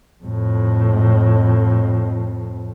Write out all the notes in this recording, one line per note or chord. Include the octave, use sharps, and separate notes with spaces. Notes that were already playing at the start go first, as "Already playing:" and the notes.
F2 A2